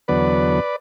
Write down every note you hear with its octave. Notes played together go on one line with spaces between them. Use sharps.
E2 D3 F#3 B3 B4 D5